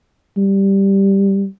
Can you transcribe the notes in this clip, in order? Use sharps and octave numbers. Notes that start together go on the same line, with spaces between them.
G3